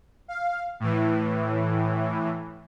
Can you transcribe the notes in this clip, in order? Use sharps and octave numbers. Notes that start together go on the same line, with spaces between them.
F5
A2 E3